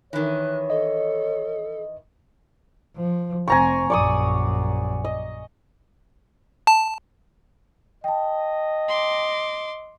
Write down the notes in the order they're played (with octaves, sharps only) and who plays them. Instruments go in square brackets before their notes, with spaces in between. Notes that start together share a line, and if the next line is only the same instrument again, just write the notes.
[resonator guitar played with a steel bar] D#3 E3 [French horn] C#5 [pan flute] F#6
[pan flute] A4 [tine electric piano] D#5
[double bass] F3
[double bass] F1 C4 [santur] G#5 A#5 C#6
[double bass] A#1 F#2 [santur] D5 C#6 D#6
[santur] D#5
[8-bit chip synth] A5
[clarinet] D#5 [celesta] G5 A5
[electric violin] C6 D6